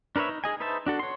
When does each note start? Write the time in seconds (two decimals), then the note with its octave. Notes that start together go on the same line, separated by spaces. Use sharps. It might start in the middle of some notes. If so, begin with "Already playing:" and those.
0.16 D4 A#4 B4 C#5 E5
0.29 D#4
0.44 G#4 D#5 G#5
0.60 D#4 B4 C5 E5 A5
0.86 D4 F#4 A4
0.99 C#5 C6